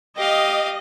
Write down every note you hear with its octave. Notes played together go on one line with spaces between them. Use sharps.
G4 D#5 F5